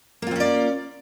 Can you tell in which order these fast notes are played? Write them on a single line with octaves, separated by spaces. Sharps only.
A#3 F4 C4 C#4 D5